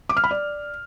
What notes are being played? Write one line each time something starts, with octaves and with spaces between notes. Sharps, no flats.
D6
F6
B5
D5